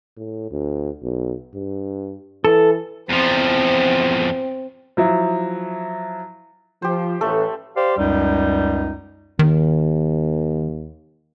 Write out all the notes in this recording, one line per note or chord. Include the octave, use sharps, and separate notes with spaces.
A2
D2
B1
G2
E3 A4
E2 F3 C4
F3 F#3 E4
F3 G4 C5
A1 A3 A4
G4 C5 D5 F5
C#2 F#2 G3 D#4
D#2 D#3